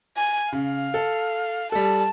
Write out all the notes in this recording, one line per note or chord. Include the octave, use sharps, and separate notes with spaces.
G#5
C#3 F5
A4
G3 A4 A5